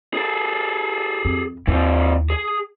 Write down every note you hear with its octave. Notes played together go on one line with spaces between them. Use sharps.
G#4 A4
F2
D#2 E3 C4 E4
G#4